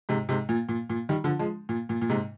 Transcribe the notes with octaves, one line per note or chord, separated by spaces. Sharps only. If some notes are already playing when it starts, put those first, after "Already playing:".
G#2 C3
G#2 C3
A#2
A#2
A#2
D#3 G3
D3 F3
F3 G#3
A#2
A#2
A#2
G#2 C3